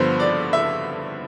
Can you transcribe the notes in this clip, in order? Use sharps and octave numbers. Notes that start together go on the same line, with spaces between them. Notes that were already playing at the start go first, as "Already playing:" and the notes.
Already playing: G2 D3 F3 B3 C5
D5
E5